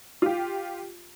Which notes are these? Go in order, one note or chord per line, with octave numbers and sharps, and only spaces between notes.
F4 G4